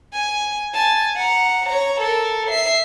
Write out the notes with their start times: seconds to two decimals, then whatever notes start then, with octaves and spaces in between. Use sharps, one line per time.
0.13 G#5
0.73 G#5 A5
1.16 F#5 A#5
1.66 C#5 A#5
2.00 A4 A#4
2.50 E5 C7